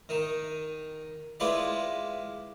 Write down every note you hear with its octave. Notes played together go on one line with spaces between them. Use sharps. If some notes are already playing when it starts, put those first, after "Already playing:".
D#3 D#4
G#3 E4 F4 B4 D5 D#5